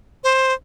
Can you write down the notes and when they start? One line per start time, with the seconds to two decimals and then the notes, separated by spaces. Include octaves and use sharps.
0.24 C5